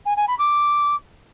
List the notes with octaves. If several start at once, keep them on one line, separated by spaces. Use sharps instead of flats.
G#5
G#5
B5
D6